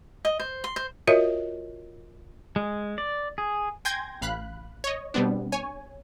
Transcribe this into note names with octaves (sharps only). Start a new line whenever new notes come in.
D#5
C5
C6
C5
F4 F#4 A#4 C#5 D#5 E5
G#3
D5
G#4
G5 G#5 C6 G6 G#6 A#6
A1 F5 B5 F#6
C#5 D#5
B2 G3 B3 C4 D4
C#5 G#5